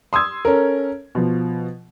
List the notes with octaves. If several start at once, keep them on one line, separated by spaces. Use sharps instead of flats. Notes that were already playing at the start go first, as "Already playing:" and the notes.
C6 D#6 E6 G#6
C#4 A4 A#4
B2 F3